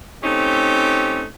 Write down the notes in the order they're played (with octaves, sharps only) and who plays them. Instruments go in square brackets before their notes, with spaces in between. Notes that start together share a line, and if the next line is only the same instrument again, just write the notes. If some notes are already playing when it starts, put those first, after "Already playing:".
[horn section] A3 C4 C#4 D#4 G4